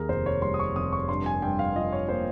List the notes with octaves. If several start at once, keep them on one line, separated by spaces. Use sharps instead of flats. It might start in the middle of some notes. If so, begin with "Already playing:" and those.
Already playing: D#2 G#4 A#4
F1 C5
C#5
G3 C6
D#6
C#6
F1 D#6
C#6
G2 C6
G#5
G2 G5
F5
F3 D#5
C#5
A#3 C5